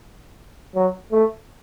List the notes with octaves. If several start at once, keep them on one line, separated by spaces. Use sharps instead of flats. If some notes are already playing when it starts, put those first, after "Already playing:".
F#3
A3